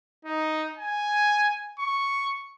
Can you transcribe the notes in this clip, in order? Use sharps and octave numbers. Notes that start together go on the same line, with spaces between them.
D#4
G#5
C#6